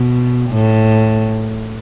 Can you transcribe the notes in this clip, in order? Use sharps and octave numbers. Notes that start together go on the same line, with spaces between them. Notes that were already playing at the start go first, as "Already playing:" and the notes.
Already playing: B2
A2